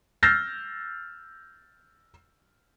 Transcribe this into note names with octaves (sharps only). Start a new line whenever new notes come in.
E6 F6 G6 A6 A#6 C7